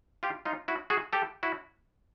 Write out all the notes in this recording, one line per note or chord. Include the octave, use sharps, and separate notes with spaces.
F4 G4
D#4 F4
E4 F#4
F#4 G#4
G4 A4
E4 F#4